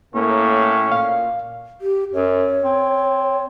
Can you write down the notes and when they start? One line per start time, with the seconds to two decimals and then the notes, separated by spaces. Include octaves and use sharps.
0.15 A2 A#3 C#4
0.92 A#2 F5
1.81 G4
2.14 F#2 C#5
2.64 C4